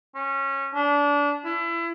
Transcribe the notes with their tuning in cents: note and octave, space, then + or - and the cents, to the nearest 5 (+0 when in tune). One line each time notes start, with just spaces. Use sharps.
C#4 -20
D4 -25
E4 +30